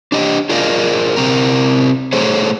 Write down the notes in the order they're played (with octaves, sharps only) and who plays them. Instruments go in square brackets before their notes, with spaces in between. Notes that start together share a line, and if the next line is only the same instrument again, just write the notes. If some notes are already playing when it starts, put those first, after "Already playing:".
[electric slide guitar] D4 G4 D#5
F4 G#4 A#4 D5 D#5 F5
C3 C4 A#4
A3 G#4 A4 C5 C#5